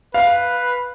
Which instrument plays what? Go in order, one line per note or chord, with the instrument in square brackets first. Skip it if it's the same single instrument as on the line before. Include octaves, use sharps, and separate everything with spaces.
[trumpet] B4 [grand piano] F5